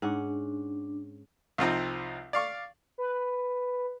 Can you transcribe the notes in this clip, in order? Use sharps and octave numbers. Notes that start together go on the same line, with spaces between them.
G#2 C#4 D4 F#5
C2 F3 C4 D#4
D5 F5 C#6
B4